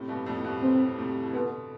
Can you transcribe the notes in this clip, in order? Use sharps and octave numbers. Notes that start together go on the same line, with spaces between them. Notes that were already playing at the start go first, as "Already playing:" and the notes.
Already playing: A2 C3
G2 B2
F2 A2
A2
G2 B2
A2 C3 C4
A2 C3
E3
B2 D3 B3